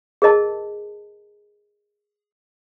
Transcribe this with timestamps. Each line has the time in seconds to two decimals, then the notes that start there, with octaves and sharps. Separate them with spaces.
0.22 G#4 A#4 D#5 A5